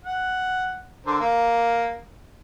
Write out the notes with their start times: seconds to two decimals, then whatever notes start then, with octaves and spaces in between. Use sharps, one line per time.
0.05 F#5
1.06 D3 A#4 C5
1.20 A#3